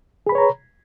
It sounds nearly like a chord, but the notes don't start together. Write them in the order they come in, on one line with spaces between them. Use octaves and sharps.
G#4 B5 B4 C#5 A#5